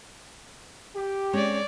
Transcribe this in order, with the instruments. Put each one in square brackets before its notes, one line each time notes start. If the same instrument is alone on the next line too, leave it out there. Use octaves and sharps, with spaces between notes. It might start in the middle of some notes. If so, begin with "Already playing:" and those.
[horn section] G4
[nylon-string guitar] G#3 C4 C#4 [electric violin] C#5 D5